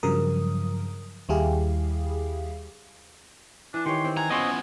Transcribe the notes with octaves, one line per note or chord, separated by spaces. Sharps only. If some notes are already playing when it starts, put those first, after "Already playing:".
G2 C#3 F3 F#3 A#4 D#6
D#2 G3 E4 G4 G#4 F5
E3 D4
D#3 G4 C#5 C6
C4 G5
F#5 G#5 A#5
B3 C#4 E4 F4 C5 C#5 D#5